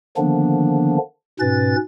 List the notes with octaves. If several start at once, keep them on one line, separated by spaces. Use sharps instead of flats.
D3 D#3 F3 A#3 B3 D4
G#2 B2 C#4 B4 A6